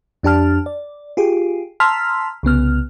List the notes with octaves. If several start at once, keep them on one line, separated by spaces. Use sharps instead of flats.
F2 D4 G4 A5 F6
D5
F4 G4 G#4
A5 A#5 C6 E6 F6 B6
C2 C#3 B3 F6